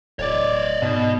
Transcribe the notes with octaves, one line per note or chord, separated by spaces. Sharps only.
D1 C#5 D5
G#2 B2